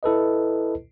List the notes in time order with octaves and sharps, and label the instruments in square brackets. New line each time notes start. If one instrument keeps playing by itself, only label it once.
[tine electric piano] E4 A4 B4 D#5